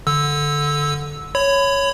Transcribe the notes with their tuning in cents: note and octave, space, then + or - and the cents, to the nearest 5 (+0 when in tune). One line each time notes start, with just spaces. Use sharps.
D3 -5 E6 -10
C#5 +0 B5 +25